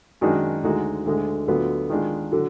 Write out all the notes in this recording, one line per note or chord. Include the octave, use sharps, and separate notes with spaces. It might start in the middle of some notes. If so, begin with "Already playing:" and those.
F#2 D#3 G#3 D4 F#4
D2 D3 G#3 D#4 F#4
D2 D3 G#3
D2 D3 F#3 B3 F4
D#3 G#3 D4 F4
D3 F#3